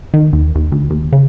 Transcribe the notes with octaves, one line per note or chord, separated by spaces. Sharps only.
D#3
D#2
D#2
D2
D#2
C#3